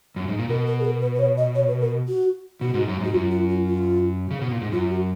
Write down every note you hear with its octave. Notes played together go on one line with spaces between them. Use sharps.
F#2
G#2
A#2
B2 A#4
A#4
G#4
A#4
B4
B4
C#5
D#5
C#5
B4
A#4
F#4
B2 F#4
G#2
F#2
G#2 F#4
F#2 F4
F4
F4
F4
C#3
B2
A#2
G#2
F#2 F4
F#4